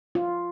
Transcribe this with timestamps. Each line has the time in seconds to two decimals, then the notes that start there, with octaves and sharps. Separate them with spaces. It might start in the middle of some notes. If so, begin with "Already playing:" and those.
0.15 F4